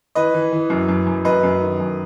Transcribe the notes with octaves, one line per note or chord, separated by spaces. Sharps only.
E3 B4 D#5
E3
E3
F#2
F#2
F#2
F#2 B4 D#5
F#2
D#3
F#2